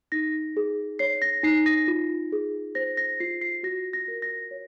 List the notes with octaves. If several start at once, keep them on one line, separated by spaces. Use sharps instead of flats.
D#4 A#6
G#4
C#5 C7
A#6
D#4 C7
A#6
F4
G#4
C5 A#6
A#6
F4 C7
C7
F#4 A#6
A#6
A#4
A#6
C#5